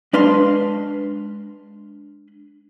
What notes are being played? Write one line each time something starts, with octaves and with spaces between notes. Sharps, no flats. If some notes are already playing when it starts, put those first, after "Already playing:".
G#3 D4 B4 F5 C6